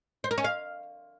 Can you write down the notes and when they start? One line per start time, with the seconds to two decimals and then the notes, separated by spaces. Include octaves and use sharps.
0.24 C5
0.31 A#4
0.38 C#4
0.44 F5